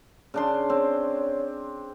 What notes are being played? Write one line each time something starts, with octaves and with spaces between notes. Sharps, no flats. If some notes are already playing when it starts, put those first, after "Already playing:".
C#3 D4 C6
C4 C#5